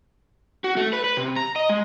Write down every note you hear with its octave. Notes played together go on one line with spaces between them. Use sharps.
F#4
A3
B4
B4
C3
A#5
D#5
G#3